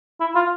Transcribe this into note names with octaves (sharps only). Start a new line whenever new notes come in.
E4
F4